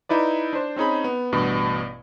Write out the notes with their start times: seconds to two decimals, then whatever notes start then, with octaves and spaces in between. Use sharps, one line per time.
0.09 D#4 E4 B4 D5
0.53 D4 C5
0.76 C4 C#4 D#4 G#4 B5
1.04 B3
1.32 A1 G2 B2